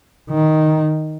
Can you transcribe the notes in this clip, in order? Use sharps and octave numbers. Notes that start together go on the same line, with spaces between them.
D#3